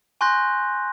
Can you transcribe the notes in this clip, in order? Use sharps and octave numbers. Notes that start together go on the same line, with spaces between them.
G#5 C6 C#6 F#6 G6 A#6